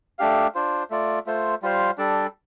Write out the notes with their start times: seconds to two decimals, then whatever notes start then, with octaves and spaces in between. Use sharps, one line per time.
0.19 A3 D4 G4 F5
0.55 D4 F4 C5
0.90 A3 F4 D5
1.26 A3 F4 C5
1.62 G3 F4 C5 F5
1.98 G3 D4 A4 D5